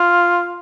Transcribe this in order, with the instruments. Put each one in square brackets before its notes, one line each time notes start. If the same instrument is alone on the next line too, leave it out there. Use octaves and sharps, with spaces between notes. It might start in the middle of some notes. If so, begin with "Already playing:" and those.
Already playing: [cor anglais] F4